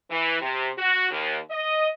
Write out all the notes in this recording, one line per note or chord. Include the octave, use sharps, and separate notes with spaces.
E3
C3
F#4
D#2
D#5